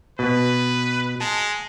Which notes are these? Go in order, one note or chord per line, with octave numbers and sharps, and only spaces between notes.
B2 B4
G#3 A5